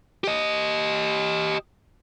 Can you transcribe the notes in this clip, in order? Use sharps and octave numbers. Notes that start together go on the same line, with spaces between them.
G4 D#5